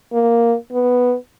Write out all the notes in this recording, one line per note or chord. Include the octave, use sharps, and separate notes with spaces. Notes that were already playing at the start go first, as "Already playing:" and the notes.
A#3
B3